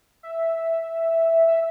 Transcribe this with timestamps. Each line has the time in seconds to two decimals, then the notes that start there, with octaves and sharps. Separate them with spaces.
0.23 E5
1.48 E5